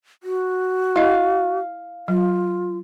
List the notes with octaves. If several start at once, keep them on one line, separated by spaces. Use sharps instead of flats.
F#4
E4 D#5 F5
F#3 F4